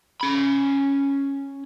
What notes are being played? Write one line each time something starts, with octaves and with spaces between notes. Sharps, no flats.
C#4 B5